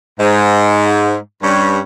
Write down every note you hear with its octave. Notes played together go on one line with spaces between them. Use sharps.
G#2
G2 G3 C#4